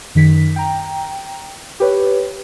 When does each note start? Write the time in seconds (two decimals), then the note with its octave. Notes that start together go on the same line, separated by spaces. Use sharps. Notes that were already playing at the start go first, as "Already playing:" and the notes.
0.15 F#2 D#3 B6
0.56 G5 A#5
1.80 G4 B4 C#5